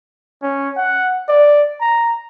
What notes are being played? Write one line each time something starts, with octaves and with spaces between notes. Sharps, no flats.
C#4
F#5
D5
A#5